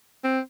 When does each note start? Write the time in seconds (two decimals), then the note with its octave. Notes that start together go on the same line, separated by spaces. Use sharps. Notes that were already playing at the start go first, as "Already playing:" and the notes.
0.24 C4